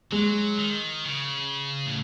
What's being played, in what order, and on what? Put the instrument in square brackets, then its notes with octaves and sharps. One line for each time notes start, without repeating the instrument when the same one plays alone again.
[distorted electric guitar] F#3 [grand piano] G#3
[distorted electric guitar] D#3
C#3
A2